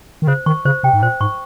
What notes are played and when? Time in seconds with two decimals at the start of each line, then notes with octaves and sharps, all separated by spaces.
0.22 D#3
0.27 C#3 C5
0.46 D#3 C#6
0.65 C#3 C5
0.83 C3 G5
0.93 G#2
1.02 A#2 C5
1.21 G#2 C#6